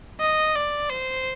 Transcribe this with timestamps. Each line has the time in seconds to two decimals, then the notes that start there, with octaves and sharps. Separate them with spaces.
0.21 D#5
0.56 D5
0.90 C5